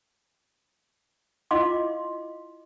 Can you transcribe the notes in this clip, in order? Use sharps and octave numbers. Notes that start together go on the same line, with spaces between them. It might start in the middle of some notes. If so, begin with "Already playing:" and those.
E4 F4 D#5 F5 C6 D6